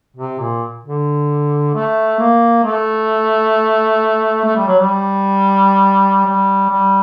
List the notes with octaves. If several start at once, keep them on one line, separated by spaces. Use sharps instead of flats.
C3
A#2
D3
A3
A#3
A3
A3
G3
F#3
G3
G3
G3